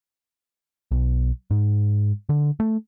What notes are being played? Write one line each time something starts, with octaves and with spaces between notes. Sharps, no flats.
B1
G#2
D3
A3